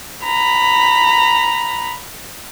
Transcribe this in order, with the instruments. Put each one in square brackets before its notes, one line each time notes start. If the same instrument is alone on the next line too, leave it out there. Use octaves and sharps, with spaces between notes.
[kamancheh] A#5 B5